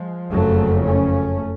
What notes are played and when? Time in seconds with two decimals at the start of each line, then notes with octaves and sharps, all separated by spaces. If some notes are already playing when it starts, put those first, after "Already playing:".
Already playing: F3 G#3
0.31 F#1 F2 C#3 F#3 A3
0.84 A3 C#4